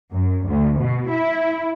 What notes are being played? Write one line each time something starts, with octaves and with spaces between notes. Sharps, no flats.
F#2
D2
B2
E4